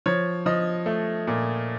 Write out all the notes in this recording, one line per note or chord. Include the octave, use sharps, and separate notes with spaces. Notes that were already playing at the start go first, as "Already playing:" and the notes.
F3 C#5
F3 D#5
A3
A#2